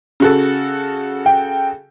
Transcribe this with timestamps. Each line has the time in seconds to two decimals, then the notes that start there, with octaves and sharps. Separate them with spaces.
0.20 C#3 F#4 A4
1.26 G5